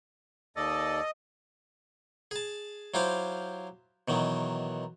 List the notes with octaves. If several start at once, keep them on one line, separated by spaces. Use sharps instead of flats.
D#2 A4 D5 D#5
G#4 A5
F#3 E4 F4 G4 C5 F5
B2 D#3 E3 F#3